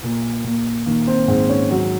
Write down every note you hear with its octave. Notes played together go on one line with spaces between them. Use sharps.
A#2 A#3
A#2 A#3
D#3 A#3
C4
G#2 C4
C#4
F#3